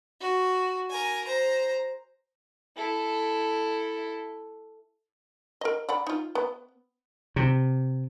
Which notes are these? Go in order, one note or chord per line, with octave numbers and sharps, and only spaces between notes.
F#4
A#4 G#5
C5 A#5
E4 A4
A#4 D#5
D5 F#5 B5
D#4 F4
B3
C3